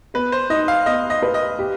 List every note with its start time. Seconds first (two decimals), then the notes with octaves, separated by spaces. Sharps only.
0.14 B3 B4
0.32 C5
0.50 D#4 D#5
0.68 F5
0.86 B3 D#5
1.10 D#5
1.22 B4
1.34 D#5
1.59 G4